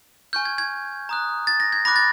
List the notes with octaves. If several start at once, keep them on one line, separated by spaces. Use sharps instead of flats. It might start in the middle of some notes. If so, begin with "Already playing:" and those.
G#5 C#6 F6 G6
G#6
G#6
A#5 D#6 F#6
A6
A#6
G#6
B5 D6 F#6 A#6
A6